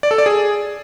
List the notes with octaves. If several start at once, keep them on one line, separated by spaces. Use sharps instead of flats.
D5
A4
D5
G#4